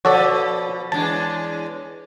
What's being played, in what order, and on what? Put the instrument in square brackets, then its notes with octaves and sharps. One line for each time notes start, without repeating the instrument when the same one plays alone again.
[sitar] B2 F3 [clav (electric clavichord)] F#4 A4 D5 [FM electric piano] C#5
[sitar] E2 G#3 D4 [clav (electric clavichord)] A5